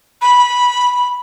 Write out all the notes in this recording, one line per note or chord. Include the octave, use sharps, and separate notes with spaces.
B5